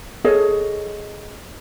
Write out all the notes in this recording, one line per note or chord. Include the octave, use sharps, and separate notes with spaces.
G#4 A4 C#5 D#5